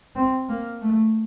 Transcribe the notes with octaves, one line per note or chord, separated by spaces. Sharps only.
C4
A#3
A3